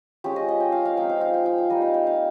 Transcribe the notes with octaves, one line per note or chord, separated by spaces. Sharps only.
G#3 C#4 F4 G4
D#5
D#5
G5
F5
F5
F3 G#3 C4 D#4 G5
F5
F5
G5
G5
F5
G3 A#3 D#4 D#5
F5
G5
F5